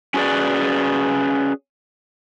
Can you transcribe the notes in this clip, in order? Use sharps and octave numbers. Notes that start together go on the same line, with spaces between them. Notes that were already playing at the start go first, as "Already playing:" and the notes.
C#4 F#4 G#4 B4 D5